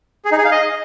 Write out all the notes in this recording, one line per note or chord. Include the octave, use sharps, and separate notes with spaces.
G#4
D#4
G#4
F5
D#5